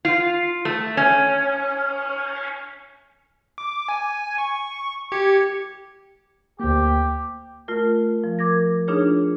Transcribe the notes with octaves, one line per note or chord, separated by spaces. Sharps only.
F4
A3
C#4
D6
G#5
C#6
G4 G#6 C#7
D2 A#3 G4
A3 F4 A#4
F3
A#4 D6 G#6 A#6
D4 D#4 F4 G#4 C#5